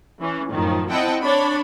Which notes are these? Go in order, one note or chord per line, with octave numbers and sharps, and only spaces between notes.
E3 C#4
F#2 A2 D#3 F3
C4 E4 D#5 F#5 G5 A5
D4 C#5 B5